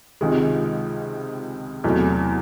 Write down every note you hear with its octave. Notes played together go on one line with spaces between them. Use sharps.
C#2 C3 D#3 G#3
E2 C3 F#3 A3